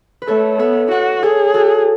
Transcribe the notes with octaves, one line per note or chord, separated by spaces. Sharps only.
B4
A3 A4 C#5
B3 C#5 E5
F#4 D5 F#5
G#4 A4 C#5
F#4 A4